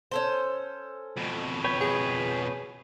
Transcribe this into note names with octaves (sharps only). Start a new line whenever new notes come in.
C#4 A4 C5
F2 B2
B4 C#5 G5
G#4